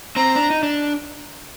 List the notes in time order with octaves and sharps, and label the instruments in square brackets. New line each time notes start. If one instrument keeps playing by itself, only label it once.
[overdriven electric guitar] C4 [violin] A#5
[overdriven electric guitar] D4
D#4
D4